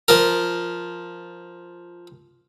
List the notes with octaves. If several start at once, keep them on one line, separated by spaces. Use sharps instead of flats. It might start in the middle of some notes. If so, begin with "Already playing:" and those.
F3 A#4